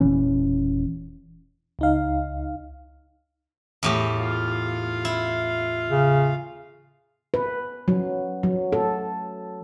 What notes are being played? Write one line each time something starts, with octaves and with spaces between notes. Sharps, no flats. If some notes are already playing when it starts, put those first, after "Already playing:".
E1 A#2 E3 C#4
C#2 D#4 F5
E2 A2 G4
F4 F5
E4
C#3
B4
F#3
F#3
A4